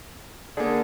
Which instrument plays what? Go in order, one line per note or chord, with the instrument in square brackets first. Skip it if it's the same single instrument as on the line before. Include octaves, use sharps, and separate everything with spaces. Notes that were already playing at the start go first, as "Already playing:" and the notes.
[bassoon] D3 [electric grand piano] A#3 G#4